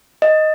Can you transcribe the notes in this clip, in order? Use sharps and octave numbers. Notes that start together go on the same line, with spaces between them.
D#5